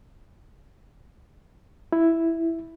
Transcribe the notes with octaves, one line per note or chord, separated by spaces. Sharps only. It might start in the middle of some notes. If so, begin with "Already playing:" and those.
E4